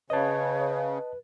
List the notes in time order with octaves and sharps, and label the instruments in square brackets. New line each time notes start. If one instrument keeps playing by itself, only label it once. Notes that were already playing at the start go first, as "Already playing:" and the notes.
[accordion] C#3 [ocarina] B4 [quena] C#5 [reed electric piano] D#5 A5